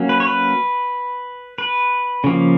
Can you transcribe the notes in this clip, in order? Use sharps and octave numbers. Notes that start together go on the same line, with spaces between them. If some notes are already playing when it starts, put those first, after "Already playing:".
Already playing: F#3 A#3 C#4
B4
C#5
B4
B4
C#3 F3 A#3